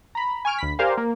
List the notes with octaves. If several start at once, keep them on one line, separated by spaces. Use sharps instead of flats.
A#5 B5
G#5 C#6 F6 D7
D2 B5 B6
G4 A#4 C5 D5 F5 G#5
A#3